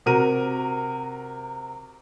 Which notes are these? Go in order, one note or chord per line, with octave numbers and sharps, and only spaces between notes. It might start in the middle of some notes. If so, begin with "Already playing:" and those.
C3 F#4 A#4 D#7